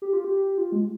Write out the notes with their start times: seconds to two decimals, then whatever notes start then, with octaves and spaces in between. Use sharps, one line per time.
0.02 G4
0.13 F4
0.24 G4
0.58 F4
0.72 G#3